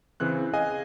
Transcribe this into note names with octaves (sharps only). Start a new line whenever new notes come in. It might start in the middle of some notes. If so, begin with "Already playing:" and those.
C#3 E3 C4 F#6
G#4 D#5 F5 G#5